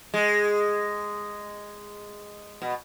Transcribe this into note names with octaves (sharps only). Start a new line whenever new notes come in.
G#3
B2